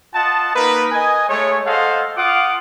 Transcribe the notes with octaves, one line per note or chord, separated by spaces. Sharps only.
F4 D#5 F#5 A5
A#3 D#4 A#4 B4
D#5 G#5
G#3 A3 C#5
A4 C5 D#5 F5 F#5
F4 F5 F#5 D6 D#6